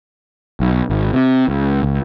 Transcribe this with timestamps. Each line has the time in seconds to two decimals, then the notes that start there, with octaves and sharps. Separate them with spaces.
0.60 B1
0.90 G#1
1.13 C3
1.49 C#2
1.83 C#2